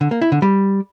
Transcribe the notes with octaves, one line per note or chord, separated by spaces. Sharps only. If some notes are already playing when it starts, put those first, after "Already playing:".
D3
A#3
E4
D3
G3